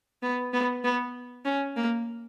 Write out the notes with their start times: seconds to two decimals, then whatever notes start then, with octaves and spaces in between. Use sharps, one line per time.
0.23 B3
0.53 B3
0.84 B3
1.45 C#4
1.76 A#3